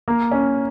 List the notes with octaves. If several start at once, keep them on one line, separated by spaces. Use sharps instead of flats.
A#3
C#4